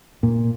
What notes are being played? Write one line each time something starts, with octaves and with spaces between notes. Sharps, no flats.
A#2